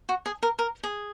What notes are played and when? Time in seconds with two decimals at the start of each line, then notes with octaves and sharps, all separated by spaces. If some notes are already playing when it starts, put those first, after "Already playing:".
0.09 F#4
0.26 G#4
0.43 A#4
0.59 A#4
0.83 G#4